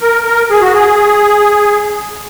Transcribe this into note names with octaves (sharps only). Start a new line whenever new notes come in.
A#4
A#4
G#4
F#4
G#4